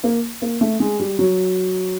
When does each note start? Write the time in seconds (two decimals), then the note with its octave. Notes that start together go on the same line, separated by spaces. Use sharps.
0.04 A#3
0.42 A#3
0.61 A3
0.80 G#3
1.00 G3
1.19 F#3